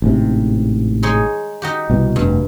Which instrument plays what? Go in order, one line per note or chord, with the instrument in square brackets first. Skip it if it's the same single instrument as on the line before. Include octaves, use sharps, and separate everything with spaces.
[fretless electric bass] A1 G#2 C3
[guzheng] G#3 D#4 C#5
D#4 F#4 G4
[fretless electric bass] C2 B2 E3
[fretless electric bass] F1 [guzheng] G2